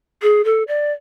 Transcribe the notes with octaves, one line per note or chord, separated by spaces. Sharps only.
G#4
A4
D5